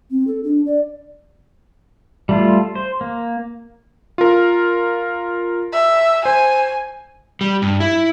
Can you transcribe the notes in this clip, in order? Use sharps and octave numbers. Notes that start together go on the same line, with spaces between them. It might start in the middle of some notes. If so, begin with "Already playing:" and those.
C4
A4
D4
D5
G3 A3 F4
C5
A#3
F4 A#4
E5
C5 G#5
G3
G2
E4